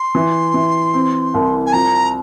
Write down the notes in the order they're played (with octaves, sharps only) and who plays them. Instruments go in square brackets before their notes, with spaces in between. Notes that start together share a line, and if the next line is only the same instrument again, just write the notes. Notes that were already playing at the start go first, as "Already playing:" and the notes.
Already playing: [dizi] C6
[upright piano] E3
E3
C4
C2
[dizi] G#5
[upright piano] F3 [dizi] A#5